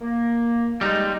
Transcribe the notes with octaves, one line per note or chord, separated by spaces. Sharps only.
A#3
G3 G#3 D#4